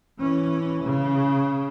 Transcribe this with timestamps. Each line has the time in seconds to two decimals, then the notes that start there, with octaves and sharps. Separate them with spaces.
0.19 E3 C#4
0.83 C#3